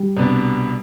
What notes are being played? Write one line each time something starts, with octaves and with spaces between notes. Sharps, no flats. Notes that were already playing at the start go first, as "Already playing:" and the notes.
Already playing: G3
C2 B2 B3 D4